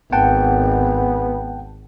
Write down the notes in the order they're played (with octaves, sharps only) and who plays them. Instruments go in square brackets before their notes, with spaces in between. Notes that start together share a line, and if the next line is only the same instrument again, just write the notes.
[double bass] G#1 [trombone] B3 [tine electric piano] F#5 G5 A5